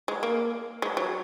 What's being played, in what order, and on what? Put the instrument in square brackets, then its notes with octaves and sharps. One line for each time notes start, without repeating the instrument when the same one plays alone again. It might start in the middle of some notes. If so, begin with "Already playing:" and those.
[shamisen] G#3
A#3
G#3
F#3